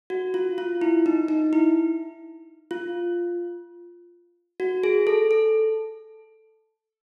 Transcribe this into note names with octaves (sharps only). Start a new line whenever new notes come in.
F#4
F4
F4
E4
D#4
D#4
E4
F4
F#4
G#4
A4
A4